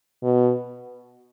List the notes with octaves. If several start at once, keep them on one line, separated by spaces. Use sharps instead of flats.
B2